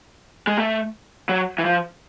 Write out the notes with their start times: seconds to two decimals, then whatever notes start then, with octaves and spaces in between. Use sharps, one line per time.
0.47 G#3
0.57 A3
1.29 F#3
1.58 E3
1.65 F3